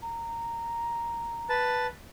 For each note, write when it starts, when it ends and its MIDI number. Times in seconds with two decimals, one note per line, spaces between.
0.02 1.52 82
1.49 1.87 71
1.49 1.87 81